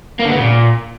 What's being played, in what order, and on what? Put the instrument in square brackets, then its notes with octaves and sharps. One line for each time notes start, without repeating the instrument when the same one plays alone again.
[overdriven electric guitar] A#3
D3
B3
C#3
A#2